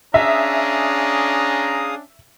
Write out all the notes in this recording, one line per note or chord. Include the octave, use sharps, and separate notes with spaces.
C#4 D4 G#4 E5 F5 A#5 D#6